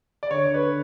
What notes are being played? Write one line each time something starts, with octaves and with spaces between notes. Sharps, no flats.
D5
D3 C#5
B4